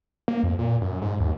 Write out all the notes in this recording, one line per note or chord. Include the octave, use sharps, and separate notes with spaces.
A#3
F2
A#2
F#2
G#2
D#2